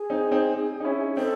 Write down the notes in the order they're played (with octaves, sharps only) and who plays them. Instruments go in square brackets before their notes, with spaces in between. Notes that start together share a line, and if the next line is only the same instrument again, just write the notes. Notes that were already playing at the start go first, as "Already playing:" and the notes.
Already playing: [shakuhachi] G#4
[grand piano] C4 D#4
C4 D#4
D#4
C#4 E4
[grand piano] C4 D#4 [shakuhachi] A4